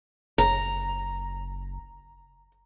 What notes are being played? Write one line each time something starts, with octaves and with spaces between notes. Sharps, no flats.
F#1 A#5